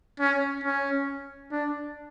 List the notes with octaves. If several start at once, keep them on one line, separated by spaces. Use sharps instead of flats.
C#4
C#4
D4